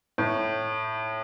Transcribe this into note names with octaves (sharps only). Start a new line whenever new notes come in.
A2